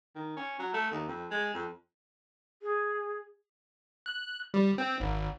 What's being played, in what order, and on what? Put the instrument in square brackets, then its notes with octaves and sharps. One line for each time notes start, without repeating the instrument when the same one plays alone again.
[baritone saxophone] D#3
C#4
F#3
A3
D#2
F2
G#3
F2
[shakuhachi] G#4
[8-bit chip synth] F#6
G3
C4
G#1